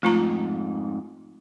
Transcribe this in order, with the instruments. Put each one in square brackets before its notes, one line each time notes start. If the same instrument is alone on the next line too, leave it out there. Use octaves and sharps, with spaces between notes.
[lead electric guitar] F2 G#2 [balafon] A3 F4 A#5